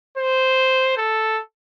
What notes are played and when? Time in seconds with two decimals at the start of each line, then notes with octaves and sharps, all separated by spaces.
0.18 C5
0.97 A4